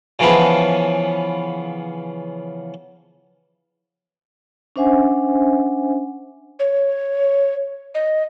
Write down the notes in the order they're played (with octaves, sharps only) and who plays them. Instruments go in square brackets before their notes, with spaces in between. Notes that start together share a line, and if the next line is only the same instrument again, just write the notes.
[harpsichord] C#3 E3 F3 B3
[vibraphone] C#4 D4 C5 E5 F#5 G#5
[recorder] C#5
D#5